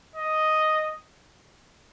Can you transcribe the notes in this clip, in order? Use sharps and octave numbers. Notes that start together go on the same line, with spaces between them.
D#5